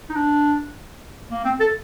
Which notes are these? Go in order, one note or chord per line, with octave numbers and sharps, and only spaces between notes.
D#4
D4
A#3
C4
A4